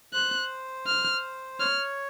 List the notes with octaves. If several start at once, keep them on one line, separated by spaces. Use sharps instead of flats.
C5 F#6
F6
C#5 F6